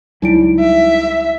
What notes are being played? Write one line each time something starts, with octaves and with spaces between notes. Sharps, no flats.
C#2 F#3 G3 D#4 E4 D7
E5